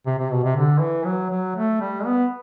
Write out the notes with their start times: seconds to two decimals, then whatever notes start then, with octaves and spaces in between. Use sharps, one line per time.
0.06 C3
0.19 C3
0.32 B2
0.44 C3
0.56 D3
0.81 E3
1.05 F#3
1.30 F#3
1.56 A3
1.81 G3
2.06 B3